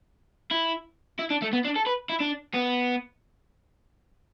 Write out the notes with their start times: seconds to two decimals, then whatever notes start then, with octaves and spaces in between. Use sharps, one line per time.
0.51 E4
1.19 E4
1.31 D4
1.42 A3
1.53 B3
1.65 D4
1.76 A4
1.86 B4
2.10 E4
2.21 D4
2.54 B3